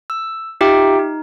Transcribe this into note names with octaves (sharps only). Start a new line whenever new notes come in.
E6
D#4 F4 G4 E5 G5
D#4